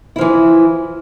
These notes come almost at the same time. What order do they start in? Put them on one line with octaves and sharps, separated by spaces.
E4 F3 E3